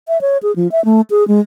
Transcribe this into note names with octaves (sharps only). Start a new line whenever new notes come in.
E5
C#5
G#4
F3
E5
A3
G#4
G#3